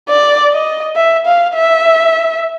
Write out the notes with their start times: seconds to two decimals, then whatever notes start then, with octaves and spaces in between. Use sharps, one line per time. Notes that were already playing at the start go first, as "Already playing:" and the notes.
0.09 D5
0.52 D#5
0.96 E5
1.26 F5
1.55 E5